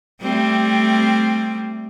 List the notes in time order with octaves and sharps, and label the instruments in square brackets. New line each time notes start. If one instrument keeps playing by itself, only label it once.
[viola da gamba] G3 A3 C4